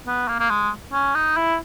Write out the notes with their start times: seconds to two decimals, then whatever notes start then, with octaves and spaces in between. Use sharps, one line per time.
0.07 B3
0.28 A#3
0.39 A#3
0.50 G#3
0.93 C#4
1.15 D#4
1.37 E4